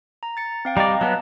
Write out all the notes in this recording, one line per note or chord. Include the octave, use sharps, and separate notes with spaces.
A#5
A6 C#7
C4 F5 G5
G3 D5 D#5 F5 A#5
F#3 B3 A5